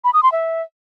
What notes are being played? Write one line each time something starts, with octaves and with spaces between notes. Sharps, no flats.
B5
D#6
C6
E5